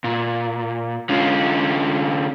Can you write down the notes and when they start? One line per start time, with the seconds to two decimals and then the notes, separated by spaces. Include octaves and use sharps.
0.04 A#2
1.09 D3 C#4 F4